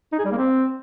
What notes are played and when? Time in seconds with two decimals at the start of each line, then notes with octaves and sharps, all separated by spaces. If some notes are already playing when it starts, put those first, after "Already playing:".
0.13 D#4
0.19 G#4
0.25 G3
0.32 A#3
0.38 C4